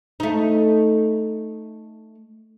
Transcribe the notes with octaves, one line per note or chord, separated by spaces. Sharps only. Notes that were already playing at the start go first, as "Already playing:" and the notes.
A3 D#4